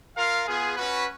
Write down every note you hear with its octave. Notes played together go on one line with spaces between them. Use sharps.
F4 A#4 F5
B3 F4 G#4
C#4 F#4 B4